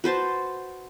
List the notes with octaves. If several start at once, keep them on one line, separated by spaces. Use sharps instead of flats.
F#4 B4 C5 A5